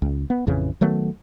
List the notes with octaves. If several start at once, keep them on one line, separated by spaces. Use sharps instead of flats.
C#2
B3
A1 F2 C#3 E3
D#3 F#3 A3 B3